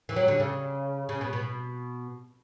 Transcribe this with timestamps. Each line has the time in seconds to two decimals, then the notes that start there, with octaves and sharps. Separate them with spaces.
0.09 E3
0.16 F#3
0.28 D3
0.40 C#3
1.09 C#3
1.21 B2
1.33 B2